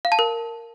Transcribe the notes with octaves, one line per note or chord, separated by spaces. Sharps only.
F5
A5
A#4